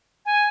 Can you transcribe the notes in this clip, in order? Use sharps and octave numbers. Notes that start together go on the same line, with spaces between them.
G#5